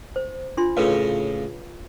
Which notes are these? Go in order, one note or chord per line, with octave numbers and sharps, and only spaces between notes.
C5
D4 F4 C6
A2 C#3 B4 C#5 F5